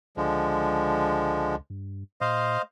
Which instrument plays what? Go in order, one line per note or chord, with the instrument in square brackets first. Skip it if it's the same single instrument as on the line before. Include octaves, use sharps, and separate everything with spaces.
[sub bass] C#2 [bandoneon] D3 F3 G#3
[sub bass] G2
[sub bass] A#2 [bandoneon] C5 D#5 F5